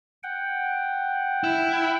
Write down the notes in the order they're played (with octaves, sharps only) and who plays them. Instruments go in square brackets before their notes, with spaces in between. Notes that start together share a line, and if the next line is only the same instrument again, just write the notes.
[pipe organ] F#5 G5
[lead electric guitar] E4